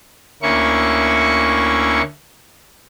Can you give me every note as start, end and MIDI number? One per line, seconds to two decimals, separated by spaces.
0.42 2.02 38
0.42 2.02 58
0.42 2.02 61
0.42 2.02 64
0.42 2.02 85